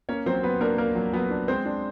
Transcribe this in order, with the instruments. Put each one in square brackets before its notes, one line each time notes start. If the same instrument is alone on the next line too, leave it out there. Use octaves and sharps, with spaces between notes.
[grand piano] A#3 C#4 C#5
F#3 C4 C5
F#3 B3 B4
A#3 D4 A#4
A#3 A#4
F#3
F#3 B3 B4
D4
G#3 C4 C5
D4